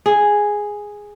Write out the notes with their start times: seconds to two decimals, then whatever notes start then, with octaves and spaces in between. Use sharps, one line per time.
0.06 G#4